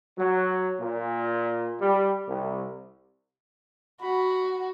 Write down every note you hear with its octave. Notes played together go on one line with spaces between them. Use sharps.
F#3
A#2
G3
C2
F#4 B5